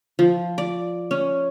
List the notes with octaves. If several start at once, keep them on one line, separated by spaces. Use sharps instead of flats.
F3
D5
C#4